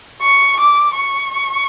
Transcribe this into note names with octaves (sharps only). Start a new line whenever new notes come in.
C#6
D6
C#6